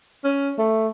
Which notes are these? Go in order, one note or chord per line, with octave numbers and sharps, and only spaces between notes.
C#4
A3